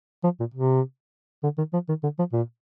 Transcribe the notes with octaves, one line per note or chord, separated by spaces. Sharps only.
F3
A#2
C3
D3
D#3
F3
D#3
D3
F3
A#2